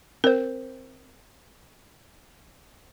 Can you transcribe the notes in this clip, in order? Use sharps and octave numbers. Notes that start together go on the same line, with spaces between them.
C4 A#4 C5